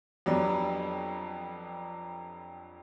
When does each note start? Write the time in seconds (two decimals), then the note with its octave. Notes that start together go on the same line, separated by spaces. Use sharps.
0.26 F2 F#3 G3 B3 D4